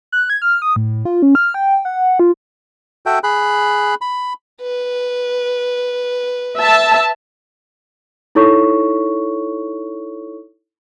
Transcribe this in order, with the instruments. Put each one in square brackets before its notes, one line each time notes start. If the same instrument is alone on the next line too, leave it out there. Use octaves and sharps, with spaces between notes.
[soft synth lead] F#6
G#6
F6
D#6
A2
F4
C#4
F6
G5
F#5
F4
[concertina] F#4 A4 E5 G5
G#4 B5 F#6
B5
[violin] B4
[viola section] E5 A5
[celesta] D#4 E4 A4 C#5 C#6